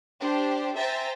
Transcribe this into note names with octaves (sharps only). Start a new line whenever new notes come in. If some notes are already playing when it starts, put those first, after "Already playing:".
D4 G4 C5
C5 E5 G5 G#5 A#5 A6